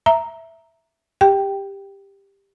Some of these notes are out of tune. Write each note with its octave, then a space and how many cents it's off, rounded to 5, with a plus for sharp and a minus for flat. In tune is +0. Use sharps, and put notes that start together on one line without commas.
E5 +0 A#5 +0
G4 +10 G5 +0